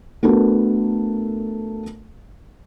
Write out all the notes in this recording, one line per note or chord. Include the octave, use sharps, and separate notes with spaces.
A3 B3 D4 F#4 A4 A#4